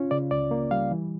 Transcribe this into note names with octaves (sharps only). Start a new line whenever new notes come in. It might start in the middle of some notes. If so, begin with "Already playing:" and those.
Already playing: C#4 F4
C#3 D5
C#2 D5
A#3
G3 F5
E3